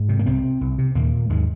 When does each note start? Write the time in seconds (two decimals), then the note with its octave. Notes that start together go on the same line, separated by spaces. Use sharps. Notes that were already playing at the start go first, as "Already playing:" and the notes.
Already playing: G#2
0.09 C3
0.19 A#3
0.26 C2 C3 C4
0.44 C3
0.61 C2
0.78 C3
0.95 D#2 A#2 A#3
1.29 D#2 G#2 G#3